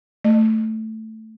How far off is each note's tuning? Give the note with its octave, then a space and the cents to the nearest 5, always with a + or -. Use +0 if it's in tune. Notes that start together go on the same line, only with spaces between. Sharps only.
A3 +0 D#5 -45